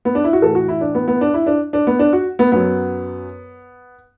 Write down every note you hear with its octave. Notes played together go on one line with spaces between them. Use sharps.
B3
D4
E4
F#4
A2 E3 A4
F#4
E4
D4
B3
B3
D4
E4
D4
D4
B3
D4
F#4
B3
F#2 F#3 B3